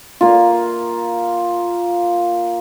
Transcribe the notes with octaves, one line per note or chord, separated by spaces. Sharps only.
A#3 F4